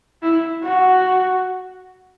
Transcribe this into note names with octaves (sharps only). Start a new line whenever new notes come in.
E4
F#4